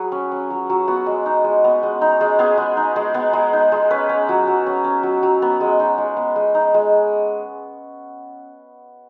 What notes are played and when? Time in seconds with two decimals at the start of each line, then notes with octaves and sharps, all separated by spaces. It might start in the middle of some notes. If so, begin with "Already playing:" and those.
Already playing: F#3 G#4 B4
0.12 C#4
0.32 C#4
0.50 F#3
0.70 F#3
0.88 B3 F#4
1.06 G#3
1.26 D#4
1.44 G#3
1.64 B3
1.83 G#3
2.01 D#4
2.21 G#3
2.39 B3 G#4
2.58 G#3
2.77 D#4
2.96 G#3
3.14 B3
3.33 G#3
3.53 D#4
3.72 G#3
3.90 C#4 B4
4.09 C#4
4.29 F#3
4.47 F#3
4.66 C#4
4.84 C#4
5.03 F#3
5.23 F#3
5.42 B3
5.61 G#3
5.80 D#4
5.98 G#3
6.17 B3
6.36 G#3
6.55 D#4
6.74 G#3